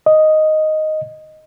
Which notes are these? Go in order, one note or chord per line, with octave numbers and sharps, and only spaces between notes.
D#5